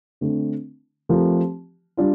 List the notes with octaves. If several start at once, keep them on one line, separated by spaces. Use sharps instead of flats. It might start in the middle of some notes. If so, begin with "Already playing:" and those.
D3 A3 C4
F3 A3 C4 G4 A#4
G3 D4 F4